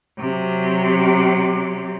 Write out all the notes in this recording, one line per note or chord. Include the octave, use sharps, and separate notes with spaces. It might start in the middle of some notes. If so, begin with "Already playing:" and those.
C3 F#3